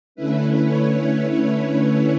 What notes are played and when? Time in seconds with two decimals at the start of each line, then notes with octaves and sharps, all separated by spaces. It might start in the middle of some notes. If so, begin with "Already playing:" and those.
0.15 D3 A3 C#4 E4 B4
0.62 C#5